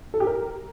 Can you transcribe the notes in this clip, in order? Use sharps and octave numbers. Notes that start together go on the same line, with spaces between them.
A4
G4
A#4